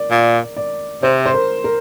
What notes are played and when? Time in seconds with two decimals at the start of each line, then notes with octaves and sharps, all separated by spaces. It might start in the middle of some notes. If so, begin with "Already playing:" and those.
Already playing: A#4 D5
0.11 A#2
0.57 D5
1.03 C3 C5
1.26 C5
1.34 A#4
1.64 A#4